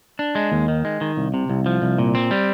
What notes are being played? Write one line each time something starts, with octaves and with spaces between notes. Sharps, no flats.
D4
G#3
D#2
D#3
G#3
D#3
C2
C3
C2
F3
C2
A#2
C4
G3